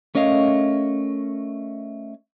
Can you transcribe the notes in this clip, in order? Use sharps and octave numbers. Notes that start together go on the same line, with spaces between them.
A3 C#4 A#4 D#5 F5